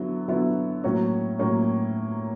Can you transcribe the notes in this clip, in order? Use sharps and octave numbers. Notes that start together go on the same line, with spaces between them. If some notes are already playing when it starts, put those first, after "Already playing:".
Already playing: D3 F#3 B3 E4
D3 F#3 B3 E4
A2 F#3 A#3 C#4
A2 F#3 A#3 C#4